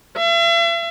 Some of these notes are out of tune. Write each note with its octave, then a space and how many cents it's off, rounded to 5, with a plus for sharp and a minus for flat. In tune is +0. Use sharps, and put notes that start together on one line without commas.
E5 +40